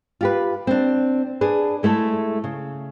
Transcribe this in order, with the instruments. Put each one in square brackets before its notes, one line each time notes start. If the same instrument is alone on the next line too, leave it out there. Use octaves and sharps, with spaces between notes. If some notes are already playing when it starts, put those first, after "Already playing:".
[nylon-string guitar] F4 G4 B4
C4 D4
D4 G#4 B4
G#3 A3 E4 A4
C#3